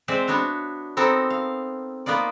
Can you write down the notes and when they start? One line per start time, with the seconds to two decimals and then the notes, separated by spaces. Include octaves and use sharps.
0.08 G#3 C4 C5 D5 E5
0.28 B3 D4 F#4 C#5
0.97 B3 C4 D#4 A4 A#4
1.30 F5
2.06 A#3 B3 D#4 F4 D5